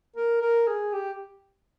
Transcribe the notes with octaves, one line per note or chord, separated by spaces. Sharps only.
A#4
A#4
G#4
G4